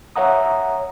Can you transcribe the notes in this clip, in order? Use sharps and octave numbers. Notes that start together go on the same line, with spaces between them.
C#5 E5 F#5 A#5 D#6